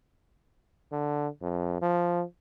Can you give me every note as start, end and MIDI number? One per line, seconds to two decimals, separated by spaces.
0.92 1.28 50
1.42 1.78 41
1.82 2.23 53